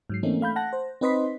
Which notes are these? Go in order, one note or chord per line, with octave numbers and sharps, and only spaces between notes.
G#2 F#3 C7
E3 A3 A#3 C4 C#4 D#4
A3 F5 B5 G6
F#5 A5 F#6 A#6
C5
C4 D#4 B4 D#5 C6 B6